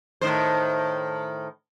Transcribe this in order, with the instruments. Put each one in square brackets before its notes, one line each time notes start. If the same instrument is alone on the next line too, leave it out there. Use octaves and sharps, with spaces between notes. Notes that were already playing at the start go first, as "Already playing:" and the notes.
[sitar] A2 D#3 C5